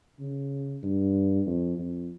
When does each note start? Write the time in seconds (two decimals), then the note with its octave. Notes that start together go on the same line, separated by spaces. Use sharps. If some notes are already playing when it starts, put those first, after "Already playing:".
0.20 C#3
0.83 G2
1.47 F2
1.79 F2